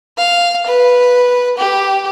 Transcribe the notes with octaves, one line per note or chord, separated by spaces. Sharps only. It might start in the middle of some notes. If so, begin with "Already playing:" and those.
F5
B4
G4